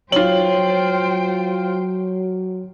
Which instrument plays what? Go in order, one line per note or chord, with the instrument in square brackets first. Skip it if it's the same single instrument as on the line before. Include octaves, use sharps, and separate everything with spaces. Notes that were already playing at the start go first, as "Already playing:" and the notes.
[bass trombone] F#3 [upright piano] F4 F#7 [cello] C5 G5 [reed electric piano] C#5